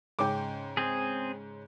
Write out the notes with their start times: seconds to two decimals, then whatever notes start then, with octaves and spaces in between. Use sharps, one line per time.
0.19 G#2 C#3 C#4 G5 D6
0.77 C4 G#4